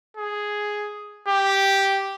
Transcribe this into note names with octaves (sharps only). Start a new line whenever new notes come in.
G#4
G4